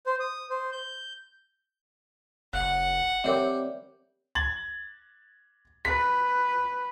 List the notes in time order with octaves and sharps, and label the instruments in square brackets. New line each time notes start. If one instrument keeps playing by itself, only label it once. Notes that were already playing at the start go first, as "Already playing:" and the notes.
[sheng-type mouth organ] C5
D#6
C5
G6
[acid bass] F#1 [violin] F#5 [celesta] F#6
[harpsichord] G3 G4 [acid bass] C4 [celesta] A#4 C#5 E5
[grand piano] G#6 A6 F#7
[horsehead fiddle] B4 [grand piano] B6